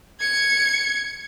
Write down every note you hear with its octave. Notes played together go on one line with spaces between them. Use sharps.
G#6 C#7